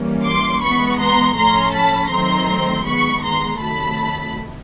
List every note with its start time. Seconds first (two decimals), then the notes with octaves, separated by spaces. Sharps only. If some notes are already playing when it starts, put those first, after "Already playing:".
Already playing: E3 G3 A#3 C#4
0.25 C6 D6
0.62 E3 G#3 B3 B5 C#6
1.00 A#5 C6
1.37 A2 F3 A3 C#4 A#5 C6
1.74 A5 B5
2.11 D#3 F#3 A3 C4 A#5 C6
2.86 D#3 G#3 B3 B5 C#6
3.24 A#5 C6
3.61 C3 D#3 F#3 A3 A5 B5